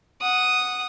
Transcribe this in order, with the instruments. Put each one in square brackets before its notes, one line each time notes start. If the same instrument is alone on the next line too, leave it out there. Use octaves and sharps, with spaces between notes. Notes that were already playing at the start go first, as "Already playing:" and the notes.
[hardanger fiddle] F#5 D#6